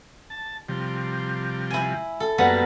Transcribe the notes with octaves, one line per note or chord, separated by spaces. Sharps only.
A5
C3 F3 G3
E4 G#5
A4
F#2 G3 A#3 B3 A5